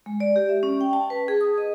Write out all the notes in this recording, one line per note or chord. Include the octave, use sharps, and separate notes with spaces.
G#3
D5
G4
E5
C#4
G5
A5
B4
G#4
D#6
D#5